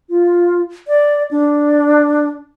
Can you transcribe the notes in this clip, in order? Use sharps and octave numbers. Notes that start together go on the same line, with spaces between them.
F4
D5
D4